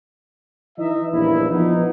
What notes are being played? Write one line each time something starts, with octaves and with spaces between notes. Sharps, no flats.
E3 D#4 D#5 E5
A#1 E2 G2 F3 E4
F3 B3 D#4